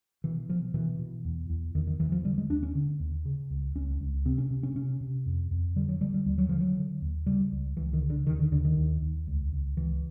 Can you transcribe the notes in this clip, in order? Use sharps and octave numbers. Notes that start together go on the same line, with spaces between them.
B2 E3
B2 F3
B2 E3
B2
E2
E2
E2 D#3
D#3
E2 E3
F3
D3 G3
G#3
D#2 D4
C#4
D3
D#2
C#3
C#2
C#2 C#4
C#2
C3 C4
C#4
C3
C#4
C3 C#4
C3
F2
F2
D3 G3
F#3
D3 G3
G3
D#2 G3
F#3
D3 F3
F#3
D3
D#2
C#3 G3
C#2
C#2 E3
D#3
C#3
D3
D#2 D#3
D3
D#2 D3
D#3
D#2
D#2
C#2
C#2
C#2 E3